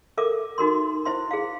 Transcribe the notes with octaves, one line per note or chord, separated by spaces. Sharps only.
A4 A#4 E5 D6
D#4 F#4 A#4 C6
E4 C5 E5 C6
G#4 F5